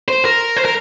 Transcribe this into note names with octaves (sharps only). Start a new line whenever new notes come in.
C5
A#4
C5
A#4